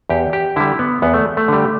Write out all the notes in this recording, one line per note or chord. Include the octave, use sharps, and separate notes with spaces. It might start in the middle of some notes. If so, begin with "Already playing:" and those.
E2 G4
G4
D3 G3 E4
B3
E2 B3
A3
A3
D3 G3